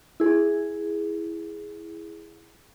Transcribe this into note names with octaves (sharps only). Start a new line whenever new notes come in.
E4 G#4